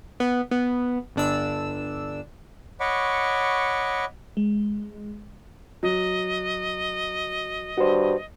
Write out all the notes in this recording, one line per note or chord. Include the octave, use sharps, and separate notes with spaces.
B3
B3
G1 D4 E6
C#5 D#5 F#5 B5 C#6 D6
G#3
F#3 D#5
G2 F#4 C5